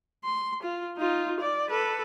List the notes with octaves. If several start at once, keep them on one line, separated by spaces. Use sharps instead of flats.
C6
F4
D#4 F4
D5
A4 B4